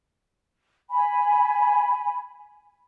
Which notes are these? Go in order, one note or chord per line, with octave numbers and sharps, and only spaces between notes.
G#5 B5